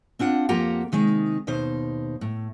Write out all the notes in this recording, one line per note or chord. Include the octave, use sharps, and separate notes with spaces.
C4 D4 F4 F#5
F2 A#3 F4 G4 F#5 A#5
C3 D#3 G#3 D#4
D#2 B2 D#4 C5
A2